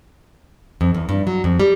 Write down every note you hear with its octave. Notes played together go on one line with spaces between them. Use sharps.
F2
E2
G2
F#3
F2
G3